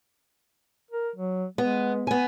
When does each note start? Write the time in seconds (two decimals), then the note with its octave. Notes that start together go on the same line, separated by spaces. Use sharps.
0.91 A#4
1.16 F#3
1.58 G#3 B3
2.07 B3 G#5